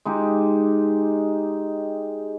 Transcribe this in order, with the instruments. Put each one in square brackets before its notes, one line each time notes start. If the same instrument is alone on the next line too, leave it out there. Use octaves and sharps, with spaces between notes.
[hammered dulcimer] G#3 D#4 G4